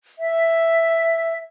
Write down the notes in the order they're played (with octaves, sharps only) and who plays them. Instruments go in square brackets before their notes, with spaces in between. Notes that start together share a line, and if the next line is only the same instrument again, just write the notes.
[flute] E5